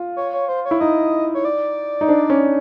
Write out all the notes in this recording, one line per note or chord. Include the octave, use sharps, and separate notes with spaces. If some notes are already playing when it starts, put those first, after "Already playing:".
Already playing: F4
C#5
C#5
C5
C#5
E4
D#4 D#5
C#5
D5
D#4
D4
C#4